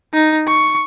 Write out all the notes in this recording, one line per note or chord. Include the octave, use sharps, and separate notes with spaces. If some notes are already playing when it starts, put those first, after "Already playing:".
D#4
C#6